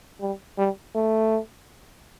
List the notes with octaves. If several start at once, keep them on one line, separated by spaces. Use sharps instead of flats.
G3
G3
A3